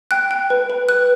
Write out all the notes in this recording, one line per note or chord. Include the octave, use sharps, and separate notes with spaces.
G5 F#6
G5
B4
B4
B4 F#6